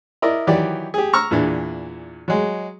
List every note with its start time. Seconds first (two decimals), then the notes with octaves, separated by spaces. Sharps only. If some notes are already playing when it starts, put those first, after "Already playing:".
0.22 E4 A#4 D5 D#5
0.47 D#3 E3 F#3 G4 D5
0.94 G4 G#4
1.13 A#5 C#6 E6 F6
1.31 E2 A#2 E3 D4
2.28 F#3 G#3